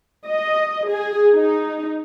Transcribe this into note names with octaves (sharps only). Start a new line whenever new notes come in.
D#5
G#4
D#4